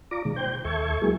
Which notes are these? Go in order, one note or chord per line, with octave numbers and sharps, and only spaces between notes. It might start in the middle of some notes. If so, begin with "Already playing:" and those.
F4 D5 A#5 D6
B2 D#3 G#3
C5 G5 G6
D#2 A4 E5 C#6 G#6
F#3 G#3 A#3 E4 G#4